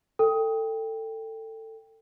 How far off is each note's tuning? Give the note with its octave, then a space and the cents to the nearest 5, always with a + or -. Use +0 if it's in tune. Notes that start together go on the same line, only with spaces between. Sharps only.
A4 +20 G5 +10